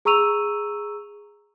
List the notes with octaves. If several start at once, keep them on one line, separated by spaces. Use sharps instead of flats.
G#4 A#5 C#6 E6 D#7 F7